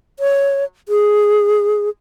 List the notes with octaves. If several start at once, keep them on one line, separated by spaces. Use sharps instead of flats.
C#5
G#4